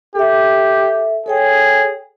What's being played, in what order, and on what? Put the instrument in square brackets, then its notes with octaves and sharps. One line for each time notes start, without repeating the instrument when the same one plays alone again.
[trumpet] G4 [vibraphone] A4 E5
[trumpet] G#4 [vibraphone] A4 C#5 G5